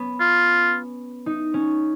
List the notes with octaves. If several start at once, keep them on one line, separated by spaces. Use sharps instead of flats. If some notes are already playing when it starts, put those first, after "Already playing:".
Already playing: B3 C#4
F4
D#4
C#4